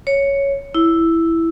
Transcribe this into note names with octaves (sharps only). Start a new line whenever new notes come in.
C#5
E4